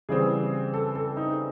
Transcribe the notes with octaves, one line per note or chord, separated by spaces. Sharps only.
C#3 E3 G3 C4 G#4
A4
A4
D#4